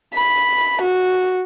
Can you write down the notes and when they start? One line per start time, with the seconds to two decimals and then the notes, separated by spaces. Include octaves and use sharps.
0.14 B5
0.82 F#4